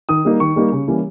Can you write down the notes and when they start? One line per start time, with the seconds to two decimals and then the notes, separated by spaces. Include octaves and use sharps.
0.09 D#3 D#6
0.25 G3 A#3 D#4
0.40 D#3 C#6
0.56 G3 A#3 D#4
0.72 C#3
0.87 E3 G3 A#3 C#4